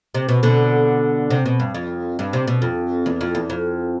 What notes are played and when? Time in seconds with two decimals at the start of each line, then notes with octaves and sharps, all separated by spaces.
0.14 C3
0.28 B2
0.43 B2 D3
1.30 C3
1.46 B2
1.60 G2
1.74 F2
2.19 G2
2.33 C3
2.48 B2
2.62 F2
3.06 E2
3.21 F2
3.35 E2
3.50 F2